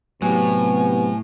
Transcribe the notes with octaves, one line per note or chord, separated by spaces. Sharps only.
A2 C3 F#3 B3 G4 G#5